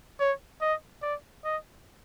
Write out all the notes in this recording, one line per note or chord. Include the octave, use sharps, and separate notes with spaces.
C#5
D#5
D5
D#5